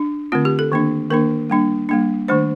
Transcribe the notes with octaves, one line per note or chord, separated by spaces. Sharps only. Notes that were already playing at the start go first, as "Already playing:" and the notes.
Already playing: D4
D3 A3 C4 F4
G4
A4
D#3 A#3 D4
D#3 A#3 D4 A#4
G3 A#3 D4
G3 A#3 D4
D#3 A3 D4 C5